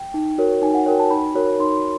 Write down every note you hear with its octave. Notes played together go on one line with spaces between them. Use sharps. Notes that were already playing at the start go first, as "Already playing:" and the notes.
Already playing: G5
D#4
F#4 A#4 C#5
D#4 G#5
F#5
F#4 A#4 C#5 G5
A5
D#4 B5
F#4 A#4 C#5
D#4 C6